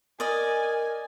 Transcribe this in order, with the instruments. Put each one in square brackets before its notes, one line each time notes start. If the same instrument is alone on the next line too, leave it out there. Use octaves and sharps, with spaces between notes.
[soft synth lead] A#4 [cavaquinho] D5 D#5 [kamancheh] G#5